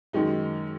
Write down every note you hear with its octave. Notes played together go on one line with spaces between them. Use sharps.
F#2 D#3 G#3 D#4